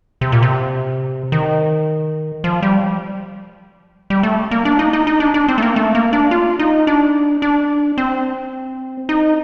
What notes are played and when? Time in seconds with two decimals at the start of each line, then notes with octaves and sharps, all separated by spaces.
0.21 C3
0.32 A#2
0.42 C3
1.32 D#3
2.44 F3
2.62 G3
4.10 G3
4.23 A3
4.51 A#3
4.65 D4
4.79 D#4
4.93 D#4
5.07 D#4
5.20 D4
5.34 D4
5.48 C4
5.58 A3
5.62 A#3
5.76 A3
5.95 A#3
6.13 D4
6.31 F4
6.59 D#4
6.87 D4
7.42 D4
7.98 C4
9.09 D#4